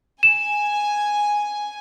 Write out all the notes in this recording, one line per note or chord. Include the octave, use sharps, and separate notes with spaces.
G#5 E7